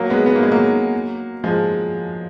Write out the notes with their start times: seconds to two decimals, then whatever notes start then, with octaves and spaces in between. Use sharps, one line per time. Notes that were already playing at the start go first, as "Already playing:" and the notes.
Already playing: F#3 A#3
0.10 G#3 B3
0.26 B3
0.36 A#3
0.43 G#3
0.51 F#3 A#3
1.44 F3 G#3